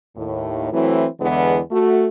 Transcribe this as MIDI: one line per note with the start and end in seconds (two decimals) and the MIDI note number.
0.17 0.70 39
0.17 0.70 45
0.72 1.06 52
0.72 1.06 54
0.72 1.06 57
0.72 1.06 60
0.72 1.06 64
1.20 1.59 40
1.20 1.59 50
1.20 1.59 52
1.20 1.59 56
1.20 1.59 59
1.71 2.07 57
1.71 2.07 66